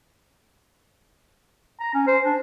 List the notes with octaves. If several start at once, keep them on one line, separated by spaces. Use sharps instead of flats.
A#5
C#4
C5
D4